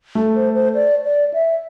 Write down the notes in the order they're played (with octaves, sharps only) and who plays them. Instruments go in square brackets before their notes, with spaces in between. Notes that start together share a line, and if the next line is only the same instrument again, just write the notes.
[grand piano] A3
[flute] C5
C5
D5
D5
E5